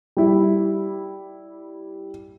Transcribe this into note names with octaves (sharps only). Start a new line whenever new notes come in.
G3 E4